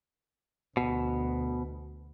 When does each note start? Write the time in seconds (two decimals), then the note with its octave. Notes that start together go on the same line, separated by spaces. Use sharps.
0.77 D2 B2